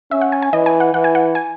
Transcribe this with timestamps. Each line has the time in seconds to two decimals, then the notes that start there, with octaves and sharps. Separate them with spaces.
0.11 C#4 E5
0.21 F#5
0.32 G#5
0.42 G#5
0.53 E3 D#5
0.66 G#5
0.80 F#5
0.94 E3 F#5
1.04 G#5
1.15 F#5
1.35 G#5